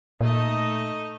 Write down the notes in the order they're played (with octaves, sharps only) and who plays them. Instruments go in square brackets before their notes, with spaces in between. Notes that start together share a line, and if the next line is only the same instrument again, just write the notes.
[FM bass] A#2 [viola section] A3 D#4 D#5